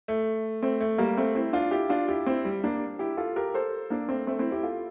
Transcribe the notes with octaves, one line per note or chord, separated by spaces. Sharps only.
A3
A3 C4
A3
G3 A#3
A3 C4
C4 E4
D4 F4
E4 G4
D4 F4
E4 G4
C4 E4
G3
A#3 D4
E4 G4
F4 A4
G4 A#4
A4 C5
A#3 D4
A3 C4
A3 C4
C4 E4
E4 G4
F4 A4